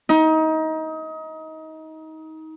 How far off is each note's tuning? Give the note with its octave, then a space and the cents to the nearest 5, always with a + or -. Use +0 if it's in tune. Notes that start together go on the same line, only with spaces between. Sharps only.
D#4 +25